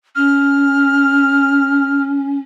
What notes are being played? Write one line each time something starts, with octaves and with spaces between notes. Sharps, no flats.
C#4 F6